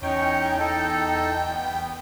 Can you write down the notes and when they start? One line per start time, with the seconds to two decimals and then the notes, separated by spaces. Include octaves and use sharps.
0.02 E2 C#4 D#4 C#5 G5
0.58 D#4 A4
1.52 B3